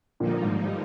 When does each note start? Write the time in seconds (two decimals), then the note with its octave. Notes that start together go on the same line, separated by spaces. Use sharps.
0.20 A#1 G2 A#2 D3 F3 A#3 D#4
0.42 G#1 G#2
0.65 G3